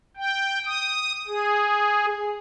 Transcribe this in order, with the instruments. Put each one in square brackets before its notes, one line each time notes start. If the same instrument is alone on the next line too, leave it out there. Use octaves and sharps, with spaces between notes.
[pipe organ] G5
D#6
G#4